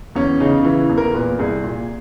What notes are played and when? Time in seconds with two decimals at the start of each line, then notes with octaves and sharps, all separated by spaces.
0.15 E2 C#4
0.40 C#3 D#4
0.65 E3 E4
0.89 E2
0.98 A#4
1.14 A#2 B4
1.39 C2 G#4
1.64 A#2